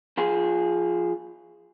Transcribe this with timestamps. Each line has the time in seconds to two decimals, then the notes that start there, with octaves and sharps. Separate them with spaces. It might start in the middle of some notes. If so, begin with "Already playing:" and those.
0.17 F3 F4 G#4